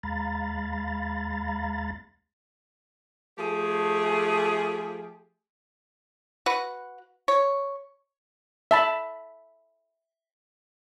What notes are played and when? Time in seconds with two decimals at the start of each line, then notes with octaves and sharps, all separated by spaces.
0.03 D#2 G#3 F5 A#5 B5 A6
3.38 F3 A3 G4 G#4
6.46 F#4 B4 F#5
7.28 C#5
8.71 E5 A5 B5